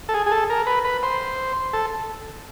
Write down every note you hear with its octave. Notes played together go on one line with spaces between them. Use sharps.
A4
G#4
G#4
A4
A#4
B4
B4
C5
A4